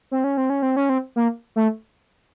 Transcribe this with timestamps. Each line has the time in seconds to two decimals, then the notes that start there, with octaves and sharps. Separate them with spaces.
0.11 C4
0.24 C#4
0.37 C4
0.50 C#4
0.62 C4
0.76 C#4
0.89 C4
1.16 A#3
1.56 A3